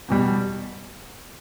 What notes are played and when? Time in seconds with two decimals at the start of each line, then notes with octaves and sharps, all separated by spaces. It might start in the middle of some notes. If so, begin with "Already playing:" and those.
0.08 E2 B2 G3